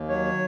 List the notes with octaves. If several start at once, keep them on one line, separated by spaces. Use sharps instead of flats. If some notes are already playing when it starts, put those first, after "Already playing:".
Already playing: D#2
F#3 C#5